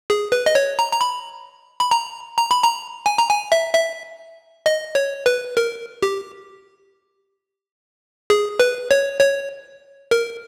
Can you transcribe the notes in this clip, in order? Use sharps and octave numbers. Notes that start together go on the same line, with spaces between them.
G#4
B4
D#5
C#5
A#5
A#5
B5
B5
A#5
A#5
B5
A#5
G#5
A#5
G#5
E5
E5
D#5
C#5
B4
A#4
G4
G#4
B4
C#5
C#5
A#4